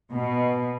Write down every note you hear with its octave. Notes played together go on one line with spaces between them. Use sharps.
B2